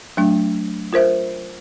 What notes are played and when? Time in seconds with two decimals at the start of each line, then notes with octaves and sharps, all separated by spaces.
0.17 F#3 A3 D4
0.93 F4 A#4 C5 E5